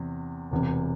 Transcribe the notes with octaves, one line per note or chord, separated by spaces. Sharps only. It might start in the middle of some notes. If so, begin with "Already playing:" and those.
Already playing: E2 C3
E1 E2 C3